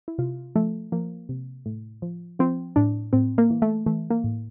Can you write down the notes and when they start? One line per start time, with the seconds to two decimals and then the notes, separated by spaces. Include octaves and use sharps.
0.08 E4
0.18 C3 F4
0.56 F3 A3
0.92 F3 A#3
1.29 C3
1.66 A2
2.02 F3
2.39 F3 C4
2.76 A2 D4
3.13 A2 C4
3.38 A#3
3.50 E3
3.62 A3
3.86 E3 A3
4.10 A#3
4.24 A2